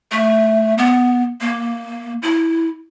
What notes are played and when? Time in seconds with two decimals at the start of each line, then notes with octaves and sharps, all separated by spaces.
0.12 A3
0.78 B3
1.41 A#3
2.23 E4